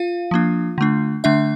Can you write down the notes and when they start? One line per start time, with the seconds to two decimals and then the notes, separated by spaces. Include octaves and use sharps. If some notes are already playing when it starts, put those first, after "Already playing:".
Already playing: F4 F5
0.31 F3 A#3 D4
0.78 D3 A3 D4
1.24 D3 A3 D4 E5